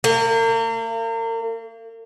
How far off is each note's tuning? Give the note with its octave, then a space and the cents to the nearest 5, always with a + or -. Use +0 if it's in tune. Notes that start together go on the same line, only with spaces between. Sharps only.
A#3 -40